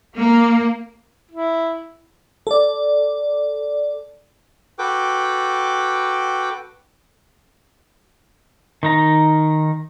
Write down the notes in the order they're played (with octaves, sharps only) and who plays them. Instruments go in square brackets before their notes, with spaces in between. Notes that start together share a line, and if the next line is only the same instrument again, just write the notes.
[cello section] A#3
[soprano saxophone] E4
[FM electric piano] A4 D5
[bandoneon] F#4 A4 B4 G5 D6
[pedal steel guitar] D#3 D#4 A#5